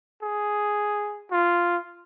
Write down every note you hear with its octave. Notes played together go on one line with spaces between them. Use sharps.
G#4
F4